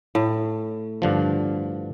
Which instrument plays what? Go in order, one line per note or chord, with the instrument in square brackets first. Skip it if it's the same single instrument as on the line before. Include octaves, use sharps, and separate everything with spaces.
[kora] A2
[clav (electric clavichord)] G2 D3 F3